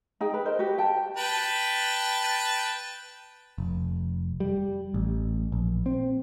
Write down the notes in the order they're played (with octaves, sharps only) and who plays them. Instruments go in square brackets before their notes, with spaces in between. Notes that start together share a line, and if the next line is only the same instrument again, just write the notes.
[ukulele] D#4 G#4 G5
B4
A#4 C5 D#5
F#4 G4
G5 A5
[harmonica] B4 G5 A5
[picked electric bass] F1
G3
A1
A#1
C4